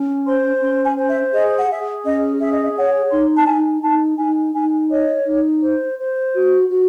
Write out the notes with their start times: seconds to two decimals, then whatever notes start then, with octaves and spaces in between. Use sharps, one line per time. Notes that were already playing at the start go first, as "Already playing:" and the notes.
Already playing: C#4
0.25 C5 C6
0.61 C#4 C6
0.85 G#5
0.96 C5
1.09 E5
1.32 G#4 D#5
1.58 F#5
1.68 G#4 E5
2.04 C#4 D#5
2.40 G#4 E5
2.52 D#5
2.63 E5
2.75 C#5 F#5
3.12 D#4 C6
3.37 A5
3.47 D#4 G#5
3.83 D#4 A5
4.18 D#4 G#5
4.54 D#4 G#5
4.90 C#5 D#5
5.26 D#4
5.62 C5
5.98 C5
6.34 F#4
6.69 F#4